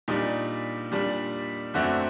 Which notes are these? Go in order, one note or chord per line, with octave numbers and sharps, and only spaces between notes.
A#2 G3 D4 D#4
A#2 G3 D4
F#2 D3 A3 C4 F#4